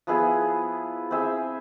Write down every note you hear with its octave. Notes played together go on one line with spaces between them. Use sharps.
F3 B3 E4 G#4
C4 G#4 C5 E5